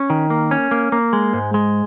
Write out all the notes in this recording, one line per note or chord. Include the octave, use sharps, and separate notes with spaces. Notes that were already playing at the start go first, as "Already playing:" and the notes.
Already playing: C#4
D#3
A#3
C#4
A#3
A#3
G#3
G#2
G#3